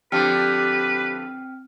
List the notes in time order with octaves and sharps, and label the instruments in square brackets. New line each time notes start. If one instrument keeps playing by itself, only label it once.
[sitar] D3 F3 [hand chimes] C4 G5 F6 [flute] G4 [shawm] B4